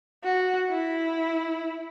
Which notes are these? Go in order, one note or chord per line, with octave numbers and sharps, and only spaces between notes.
F#4
E4